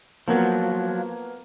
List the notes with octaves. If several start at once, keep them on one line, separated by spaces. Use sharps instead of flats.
F3 F#3 A#3 B3